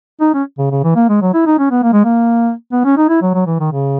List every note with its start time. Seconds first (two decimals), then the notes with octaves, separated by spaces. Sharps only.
0.21 D#4
0.34 C#4
0.58 C#3
0.71 C#3
0.84 E3
0.96 A#3
1.09 G#3
1.22 F#3
1.34 E4
1.47 D#4
1.59 C#4
1.71 B3
1.83 A#3
1.93 G#3
2.05 A#3
2.72 B3
2.85 C#4
2.97 D#4
3.09 E4
3.22 F#3
3.34 F#3
3.46 E3
3.60 D#3
3.72 C#3